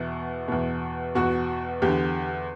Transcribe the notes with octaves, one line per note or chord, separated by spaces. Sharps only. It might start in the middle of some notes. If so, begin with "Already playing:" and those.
Already playing: E2 B2 E4
E2 B2
E2 B2 F#4
E2 D3 G4